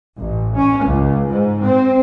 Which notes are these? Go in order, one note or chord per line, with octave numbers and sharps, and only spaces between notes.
A1
C#4
C#2
G#2
C4